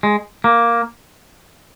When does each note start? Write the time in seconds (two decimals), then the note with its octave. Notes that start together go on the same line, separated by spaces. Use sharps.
0.03 G#3
0.44 A#3